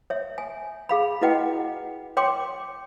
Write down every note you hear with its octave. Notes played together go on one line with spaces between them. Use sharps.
C#5 E5
G#5
G#4 F5 B5
E4 F#4 B4 D#5 F#5 G5
C#5 G5 C6 D6